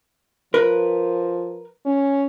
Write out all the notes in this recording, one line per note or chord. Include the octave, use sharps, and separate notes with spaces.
F3 A#4 B4
C#4